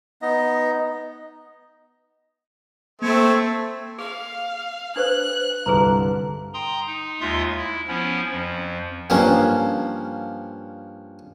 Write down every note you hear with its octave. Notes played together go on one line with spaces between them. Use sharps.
B3 D#4 D#5
A3 A#3 C4 G#6 C#7
G#4 F5
D4 B4 C5 F#6
C2 G2 D3 G#4 B4 A#5
G5 A#5 C6 D#6
D#4
D#2 G#3 F4 E5 C6 D#6
E4
F3 B3 C#4 E4
F2 F3
G2 F3 A#3 C#4